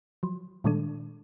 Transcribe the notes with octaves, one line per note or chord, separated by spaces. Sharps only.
F3 F#3
A#2 D#3 G3 G#3 D4 A4